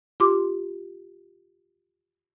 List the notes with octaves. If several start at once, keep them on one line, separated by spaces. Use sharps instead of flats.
F4 G4 C6 D6